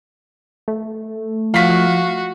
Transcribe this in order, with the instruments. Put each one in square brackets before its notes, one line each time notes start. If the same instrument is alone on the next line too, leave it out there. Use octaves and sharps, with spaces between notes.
[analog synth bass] A3
[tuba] F3 [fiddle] F#4 [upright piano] F5 B6